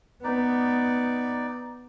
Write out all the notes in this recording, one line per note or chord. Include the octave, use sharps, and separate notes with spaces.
B3 D#4 D5